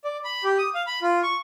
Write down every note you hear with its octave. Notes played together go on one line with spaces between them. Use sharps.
D5
B5
G4
D#6
F5
B5
F4
C#6